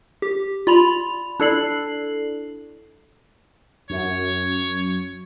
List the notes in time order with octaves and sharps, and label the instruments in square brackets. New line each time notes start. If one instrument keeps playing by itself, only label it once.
[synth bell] G4
F4 D5 B5 F7
D4 E4 A4 D5 C7 F#7
[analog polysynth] F#2 [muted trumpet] C#5